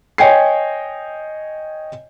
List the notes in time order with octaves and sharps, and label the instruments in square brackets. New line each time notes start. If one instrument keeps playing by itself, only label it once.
[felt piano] C#5 D#5 G5 G#5 C7